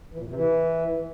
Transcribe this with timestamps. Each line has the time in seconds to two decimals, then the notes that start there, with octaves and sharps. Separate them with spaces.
0.14 E3
0.19 A#2
0.24 E2
0.30 C3
0.35 E3